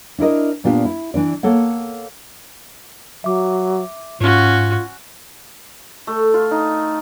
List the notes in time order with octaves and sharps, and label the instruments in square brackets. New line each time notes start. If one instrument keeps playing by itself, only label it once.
[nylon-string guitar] D4 E4 A#4 D#5
A#2 B3 D4 F4 G4
E4
E3 D4 D5
A#3 A4 C#5 F#5
[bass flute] F#3 [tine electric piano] E5 D6
[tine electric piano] G#2 [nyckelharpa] C#4 F#4 [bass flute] F4
[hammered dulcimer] A3
F4
D#4